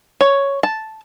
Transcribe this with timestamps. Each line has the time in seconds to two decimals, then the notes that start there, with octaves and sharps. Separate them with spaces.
0.21 C#5
0.63 A5